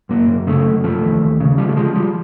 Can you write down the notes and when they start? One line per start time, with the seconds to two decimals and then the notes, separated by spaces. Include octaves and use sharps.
0.09 F#2 A#3
0.29 F#2
0.47 C#3 A3
0.66 F#2
0.84 F3 A3
1.03 D#2
1.22 D#2
1.40 C#3
1.58 F3 G3
1.69 A3
1.76 F3 G#3
1.95 F3 G3